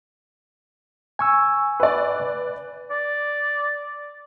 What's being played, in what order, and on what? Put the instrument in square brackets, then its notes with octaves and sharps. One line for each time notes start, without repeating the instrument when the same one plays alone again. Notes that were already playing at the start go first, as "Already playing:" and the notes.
[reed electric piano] G#5 C#6 E6
[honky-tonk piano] B4 D5
[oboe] D5